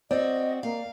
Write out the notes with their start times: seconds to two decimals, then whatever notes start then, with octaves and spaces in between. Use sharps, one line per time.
0.11 C4 F#4 D5 D#5
0.63 A#3 F5